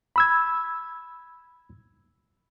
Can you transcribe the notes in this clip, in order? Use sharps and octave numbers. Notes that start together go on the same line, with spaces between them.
B5 E6 G#6